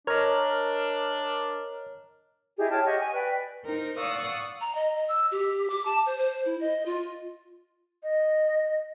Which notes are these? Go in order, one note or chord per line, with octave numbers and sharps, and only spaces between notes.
D4 A#4 C#5 D#5 A#5 F6
E4 G4 G#4 D#5
C#5 G5 A5 F6
G4 D#5 F#5 C#6
G#5 C#6
B4 D5 G5 F#6
D#4 A#4 C5
D5 F5 F#5 C#6 D#6 E6
A#5
D#5
D#5
E6
G4
D6
A5
C5
C5
E4
D#5
F4
D#5